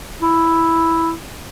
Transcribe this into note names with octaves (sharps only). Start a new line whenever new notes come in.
E4